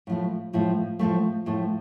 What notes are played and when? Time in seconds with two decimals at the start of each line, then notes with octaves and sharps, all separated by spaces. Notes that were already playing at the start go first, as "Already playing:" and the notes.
0.07 A2 F3 A3
0.53 A2 F3 A3
0.99 A2 F3 A3
1.46 A2 F3 A3